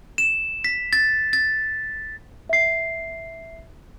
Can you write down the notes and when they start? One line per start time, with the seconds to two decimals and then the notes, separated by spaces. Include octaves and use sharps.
0.18 E7
0.64 B6
0.93 A6
1.33 A6
2.49 E5 C7